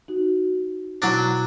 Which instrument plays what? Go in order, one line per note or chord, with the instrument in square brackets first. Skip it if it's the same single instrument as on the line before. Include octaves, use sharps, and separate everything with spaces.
[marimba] D#4 F#4
[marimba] B2 E4 [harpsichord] F#3 D4